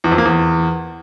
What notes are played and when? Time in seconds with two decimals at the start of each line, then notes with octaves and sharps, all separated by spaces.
0.04 E2
0.11 F2
0.18 A#3
0.25 E2